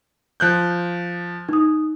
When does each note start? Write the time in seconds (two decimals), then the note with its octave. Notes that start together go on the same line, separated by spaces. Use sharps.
0.40 F3 F#6 G6
1.49 D#4 D#6